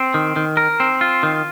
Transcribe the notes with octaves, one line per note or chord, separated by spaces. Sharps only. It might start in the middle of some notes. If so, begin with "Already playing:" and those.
Already playing: C4
D#3
D#3
A#4
C4
F4
D#3